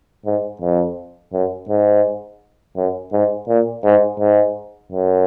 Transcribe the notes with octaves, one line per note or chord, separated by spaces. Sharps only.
G#2
F2
F#2
G#2
F#2
G#2
A#2
G#2
G#2
F#2